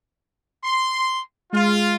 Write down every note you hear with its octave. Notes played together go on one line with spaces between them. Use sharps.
C6
G#3 F4